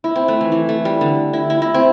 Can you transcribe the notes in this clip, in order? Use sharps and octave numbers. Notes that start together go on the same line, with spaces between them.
E4
C4
A3
E3
E3
A3
G3
D3
E4
E4
E4
C4